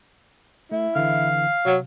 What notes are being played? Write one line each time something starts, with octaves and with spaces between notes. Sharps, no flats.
A3 E4
D3 E3 F5
C3 F#3